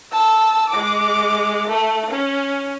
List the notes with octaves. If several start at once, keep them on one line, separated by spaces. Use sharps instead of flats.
A5 E6
G#3 D6
A3
C#4